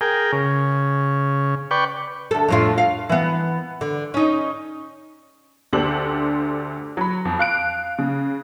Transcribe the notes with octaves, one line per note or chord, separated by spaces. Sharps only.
G#4 A#4 G5
C#3
B4 D5 G5 C#6
D2 A4
F2 A2 F4
F5
E3 B3
D3
C#4 D#4
D2 D4 G4 A4 C5 F#7
F#3 B5
F2
F5 F#6 D7
C#3